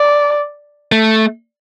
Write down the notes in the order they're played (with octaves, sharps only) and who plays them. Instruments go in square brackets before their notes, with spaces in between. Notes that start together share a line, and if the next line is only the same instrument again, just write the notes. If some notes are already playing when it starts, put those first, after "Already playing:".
Already playing: [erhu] D5
[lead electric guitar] A3